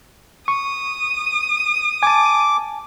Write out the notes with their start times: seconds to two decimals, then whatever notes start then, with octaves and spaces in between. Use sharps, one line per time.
0.48 C#6 D#6
2.03 G#5 A5 D6